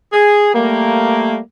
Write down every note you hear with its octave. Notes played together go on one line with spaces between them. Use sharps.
G#4
G3 A3 A#3